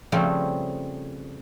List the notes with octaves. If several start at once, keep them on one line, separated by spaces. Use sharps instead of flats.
C#3 F3 G3 A3 C4